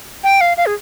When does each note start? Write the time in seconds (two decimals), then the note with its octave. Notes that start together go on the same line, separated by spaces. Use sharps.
0.24 G5
0.41 F5
0.57 F5
0.66 G#4